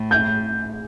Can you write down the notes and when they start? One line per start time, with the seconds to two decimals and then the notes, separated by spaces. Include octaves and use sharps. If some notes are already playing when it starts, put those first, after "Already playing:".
Already playing: A2
0.11 G6